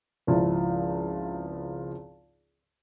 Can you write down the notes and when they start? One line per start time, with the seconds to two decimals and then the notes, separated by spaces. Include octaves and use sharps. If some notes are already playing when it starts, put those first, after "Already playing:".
0.27 G#1 C#2 F3 E4